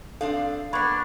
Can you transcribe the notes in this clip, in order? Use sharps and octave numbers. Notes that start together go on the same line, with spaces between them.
C4 D4 A4 F5
A#3 B3 D4 B5 C#6 G#6